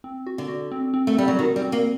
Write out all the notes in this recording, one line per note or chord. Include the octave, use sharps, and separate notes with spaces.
C4
F#4
D3
F#4
C4
C4
A3
G3 C4
F#3
D#3 F#4
G3
C4
A#3